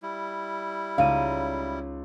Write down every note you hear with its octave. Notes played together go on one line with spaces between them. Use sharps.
G3 E4
C#2 D#4 F5 D#7